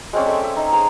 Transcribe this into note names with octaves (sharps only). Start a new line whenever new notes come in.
G#3 C4 C#4 D5
A4 E5
E5
D#4
G#4 C5 A#5